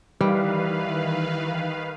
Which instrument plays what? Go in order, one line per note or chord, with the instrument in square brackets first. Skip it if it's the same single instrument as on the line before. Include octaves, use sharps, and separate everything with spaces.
[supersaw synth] D#3 B4 F5 [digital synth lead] E3 [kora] G3